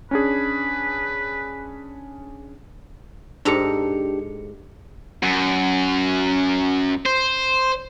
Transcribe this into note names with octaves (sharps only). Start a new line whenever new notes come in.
C#4 D4 G#4 B4
G#2 D4 G4 A4 A#5 C#7
F#2
C5